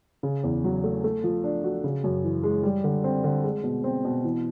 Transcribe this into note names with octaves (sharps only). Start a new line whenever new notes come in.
C#3
E2
F#3
A3
A3
F3
D4
F#4
C#3
F#2
E3
G#3
G3
D3
C4
D3
G#3
B2
C4
B2
E3